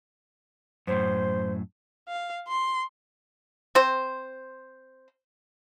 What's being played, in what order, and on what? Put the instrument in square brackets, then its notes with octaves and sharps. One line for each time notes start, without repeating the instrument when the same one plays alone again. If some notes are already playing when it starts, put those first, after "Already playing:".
[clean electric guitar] F#2 A2 [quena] C5
[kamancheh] F5
C6
[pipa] C4 C5